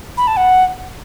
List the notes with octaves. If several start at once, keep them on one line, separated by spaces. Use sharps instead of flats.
B5
A5
F#5